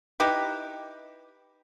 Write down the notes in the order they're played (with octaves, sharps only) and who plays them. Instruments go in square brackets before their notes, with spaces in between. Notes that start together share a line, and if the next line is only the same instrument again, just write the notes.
[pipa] D#4 E4 G4 B4